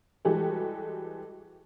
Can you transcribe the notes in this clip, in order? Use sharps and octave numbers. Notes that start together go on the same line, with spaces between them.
E3 G3 G#3 F#4 G4 A4